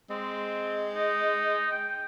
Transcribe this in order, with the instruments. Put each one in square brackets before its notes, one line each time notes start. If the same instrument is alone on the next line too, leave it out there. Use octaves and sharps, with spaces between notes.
[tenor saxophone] G#3 [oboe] C4
[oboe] D#4
G5